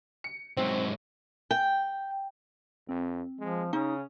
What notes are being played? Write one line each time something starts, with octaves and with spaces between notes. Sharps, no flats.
C#7
G#2 F#3 C4
G5
F2 C4
F3 G#3
C#3 C#4 D#4 D#6